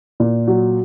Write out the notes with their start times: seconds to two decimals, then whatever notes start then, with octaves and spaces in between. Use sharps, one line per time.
0.20 A#2
0.47 F#3